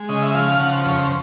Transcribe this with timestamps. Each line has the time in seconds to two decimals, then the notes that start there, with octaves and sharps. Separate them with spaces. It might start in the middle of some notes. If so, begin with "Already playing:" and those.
Already playing: G#3
0.09 C#3 D#5
0.22 E5
0.34 F3 F5
0.48 F5
0.60 C#3 F#5
0.73 C5
0.86 F2 C#5
0.99 C5